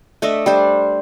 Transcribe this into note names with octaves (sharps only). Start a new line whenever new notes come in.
A3 D4 D#5 E5
G3 D4 C5